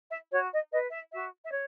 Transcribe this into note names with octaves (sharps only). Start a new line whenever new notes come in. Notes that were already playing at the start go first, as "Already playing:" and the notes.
E5
F#4 C#5
D#5
B4 D#5
E5
F#4 E5
E5
C#5